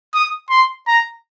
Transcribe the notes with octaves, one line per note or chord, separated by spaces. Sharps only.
D#6
C6
A#5